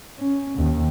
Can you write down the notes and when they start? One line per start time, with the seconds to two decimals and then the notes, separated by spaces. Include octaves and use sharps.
0.18 C#4
0.58 D#2 D#3